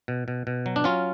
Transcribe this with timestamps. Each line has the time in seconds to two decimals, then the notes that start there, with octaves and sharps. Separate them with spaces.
0.08 B2
0.28 B2
0.47 B2
0.66 F#3
0.76 D4
0.84 F#3 C#4 F4